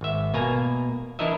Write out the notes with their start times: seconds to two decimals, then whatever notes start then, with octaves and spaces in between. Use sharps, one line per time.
0.01 G#1 E5
0.34 B2 A#3 G#5 A#5
1.19 E3 D4 E4 A#4 D#5 E5